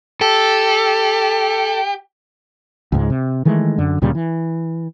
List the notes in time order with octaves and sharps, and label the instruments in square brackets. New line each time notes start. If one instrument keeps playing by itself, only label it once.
[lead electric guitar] G4 [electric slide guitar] A4
[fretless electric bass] C#2 G#2 G#3
C3
D#3 E3 G#3 A3
F#2 D3
D2 A#2 C#3 G3
E3